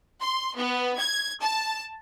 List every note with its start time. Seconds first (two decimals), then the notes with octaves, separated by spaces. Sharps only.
0.21 C6
0.56 B3
0.98 G#6
1.41 A5